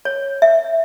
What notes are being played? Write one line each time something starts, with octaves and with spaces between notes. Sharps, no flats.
C#5
E5